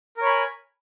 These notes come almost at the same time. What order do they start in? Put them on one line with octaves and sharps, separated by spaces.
A#4 C#5 B5 G#5